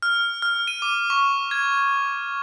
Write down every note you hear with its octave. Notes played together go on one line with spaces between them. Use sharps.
F6
F6
D#7
D6
C#6
G#6